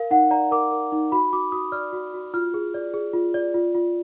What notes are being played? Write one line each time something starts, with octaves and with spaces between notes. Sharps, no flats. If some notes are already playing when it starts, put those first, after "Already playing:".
Already playing: A#4 F5
D#4 F#5
D5 A#5
A#4 D6
A#4
D#4
F#4 B5
F#4 D6
F#4 D#6
D5 F6
F#4
F#4
F4 F6
G#4
D5
G#4
F4
D5
F4
F4